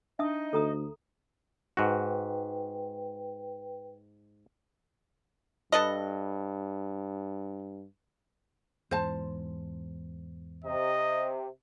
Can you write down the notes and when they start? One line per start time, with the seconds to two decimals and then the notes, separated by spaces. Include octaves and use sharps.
0.19 D4 D#4 D#5 E5 A5 D#6
0.53 D2 A4 A#5 D#6
1.77 G#2 F#4 B4 G5
5.72 G2 A4 B4 D#5
8.91 E2 G#2 C5 A5
10.64 C3 D#5